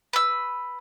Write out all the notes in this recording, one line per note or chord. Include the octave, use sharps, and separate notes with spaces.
B4 E6